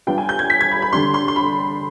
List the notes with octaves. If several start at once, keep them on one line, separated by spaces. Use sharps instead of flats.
G3 B3 D4 F4 G5
G#5
G6
G#6
B6
G#6
B5
B5
D3 G3 D4 C6
C6
C6
B5